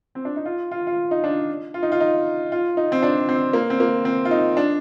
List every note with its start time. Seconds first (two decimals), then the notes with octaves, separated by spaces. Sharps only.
0.15 C4
0.25 D4
0.36 D#4
0.45 F4
0.71 F4
0.87 F4
1.11 D#4
1.24 D4
1.74 F4
1.83 D#4
1.92 F4
2.00 D#4
2.52 F4
2.77 D#4
2.92 C4
3.03 D4
3.29 C4
3.53 A#3
3.70 C4
3.80 A#3
4.05 C4
4.25 F4
4.31 D#4
4.57 D4